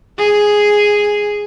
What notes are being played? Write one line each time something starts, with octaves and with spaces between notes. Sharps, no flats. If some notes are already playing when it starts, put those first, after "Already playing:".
G#4